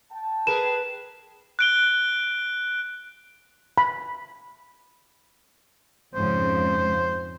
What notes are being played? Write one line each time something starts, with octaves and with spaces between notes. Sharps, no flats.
G5 A5
G#4 A#4 B4 E7
F#6 D7 G7
B5
F2 G#2 C#3 C5